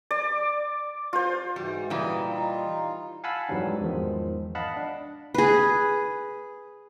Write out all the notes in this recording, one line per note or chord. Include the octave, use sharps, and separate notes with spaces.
D5
F4 C5
G#2 E3 G3 F#4
A#2 E3 G3 D#5
D#4 F4
F5 F#5 G#5 A5 B5 E6
F2 G#2 E3 F#3 G3 D4
E2 G#2 D#3 F3
D#5 F5 F#5 A5 B5
D4
G#4 B4